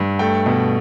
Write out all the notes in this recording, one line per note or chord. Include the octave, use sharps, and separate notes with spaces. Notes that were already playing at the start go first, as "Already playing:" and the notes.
Already playing: G2
A3 G5
B2